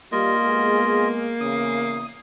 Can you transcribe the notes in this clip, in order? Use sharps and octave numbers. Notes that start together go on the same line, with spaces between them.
G3 A#3 F4 G4 D#5
G#3 B3 G#4
E2 C#3 D#6